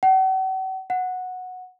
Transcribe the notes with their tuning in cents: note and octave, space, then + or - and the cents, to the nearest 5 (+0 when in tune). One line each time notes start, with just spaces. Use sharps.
F#5 +45
F#5 -10